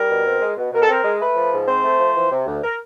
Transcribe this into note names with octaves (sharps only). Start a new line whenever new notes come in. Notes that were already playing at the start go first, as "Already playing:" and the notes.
Already playing: G3 A#4
B2
C4
G#3
B2
B2 A#4
A4
C4 A#4
G#3
A3 B4
F3
G#2
C4 C5
A3
F3
E3
C3
D2
A#4